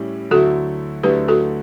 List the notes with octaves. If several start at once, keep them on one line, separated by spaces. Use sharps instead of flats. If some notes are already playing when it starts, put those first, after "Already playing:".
Already playing: A2 G3 C#4 E4
D2 D3 F#3 A3 E4 F#4 A4
D2 D3 F#3 A3 E4 G4 B4
F#4 A4